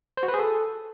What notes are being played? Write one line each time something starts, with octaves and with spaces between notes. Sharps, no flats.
C5
F#4
B4
G#4
A4